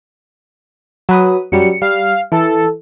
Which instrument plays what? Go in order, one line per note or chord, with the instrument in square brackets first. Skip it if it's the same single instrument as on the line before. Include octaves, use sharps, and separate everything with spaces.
[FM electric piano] F#3 B4 D#6
[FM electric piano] F#2 F#3 G3 [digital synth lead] C#7
[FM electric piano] G3 [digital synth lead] F5
[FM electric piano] E3 [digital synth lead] A4